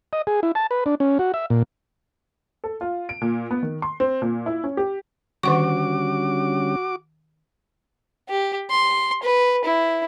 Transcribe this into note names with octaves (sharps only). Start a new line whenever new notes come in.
D#5
G#4
E4
A5
B4
D4
C#4
F#4
E5
A#2
A4
F4
D7
A#2
B3
D#3
C6
C4
A#2
E4
C#4
G4
D3 D#3 G3 C#4 F#4 F#5 C#6 D6
G4
C6
B4
E4